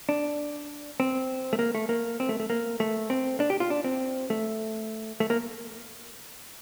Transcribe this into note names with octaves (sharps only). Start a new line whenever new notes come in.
D4
C4
A3
A#3
A3
A#3
C4
A3
A3
A#3
A3
C4
D4
G4
F4
D4
C4
A3
A3
A#3